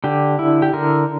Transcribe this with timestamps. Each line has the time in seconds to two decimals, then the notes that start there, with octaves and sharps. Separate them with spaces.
0.04 D3 G4
0.39 E4
0.62 G4
0.73 D3 A#4